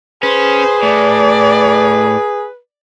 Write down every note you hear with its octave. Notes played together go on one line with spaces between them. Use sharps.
C#4 G#4 B4 C5
A2 D5